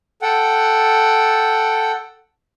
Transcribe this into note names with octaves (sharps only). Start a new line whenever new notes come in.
A4 F#5 G5